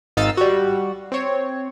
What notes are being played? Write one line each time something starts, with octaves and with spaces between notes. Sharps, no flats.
G#1 D#4 F5 E6 A6
G3 F#4
C4 C#5